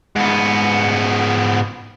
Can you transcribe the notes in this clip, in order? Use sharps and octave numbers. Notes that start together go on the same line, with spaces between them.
G#2 B3